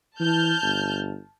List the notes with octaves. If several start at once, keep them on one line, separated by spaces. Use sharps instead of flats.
E3 A5 F6 G6
G1